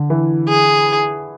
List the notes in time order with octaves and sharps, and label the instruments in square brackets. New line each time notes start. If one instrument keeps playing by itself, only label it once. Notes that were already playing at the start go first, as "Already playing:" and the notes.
Already playing: [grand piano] D3
E3
[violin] G#4